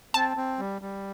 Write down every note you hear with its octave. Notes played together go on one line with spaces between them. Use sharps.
C4 A5
C4
G3
G3